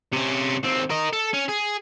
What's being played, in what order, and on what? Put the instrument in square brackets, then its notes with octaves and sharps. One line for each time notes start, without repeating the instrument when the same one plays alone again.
[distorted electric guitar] C3 C#4
D#2 C4
A#4 D#5
A4
C#4
G#4